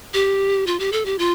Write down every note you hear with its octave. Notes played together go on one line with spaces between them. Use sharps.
G4
F4
G4
A4
G4
F4